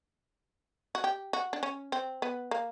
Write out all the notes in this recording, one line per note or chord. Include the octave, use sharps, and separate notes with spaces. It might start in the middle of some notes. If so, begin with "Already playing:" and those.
F#4
G4
F#4
D4
C#4
C4
B3
A#3